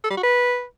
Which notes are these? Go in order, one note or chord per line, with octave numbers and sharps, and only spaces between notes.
A4
G3
F#4
B4